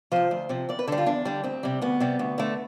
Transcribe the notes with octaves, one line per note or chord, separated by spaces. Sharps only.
C3 F3 C5
D2
C3 F3
E2 D5
B4
D3 G3 A4
F4
E2 D4
D3 G3
D2 C4
C3 G3
D2 B3
C3 G3
D2
D3 A3